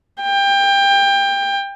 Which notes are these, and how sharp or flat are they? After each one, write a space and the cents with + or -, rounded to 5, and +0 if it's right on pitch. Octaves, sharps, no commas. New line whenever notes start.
G5 +25